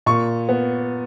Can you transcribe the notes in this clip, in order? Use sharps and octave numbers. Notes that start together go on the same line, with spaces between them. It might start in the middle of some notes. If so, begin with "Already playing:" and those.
A#2 C#6
B3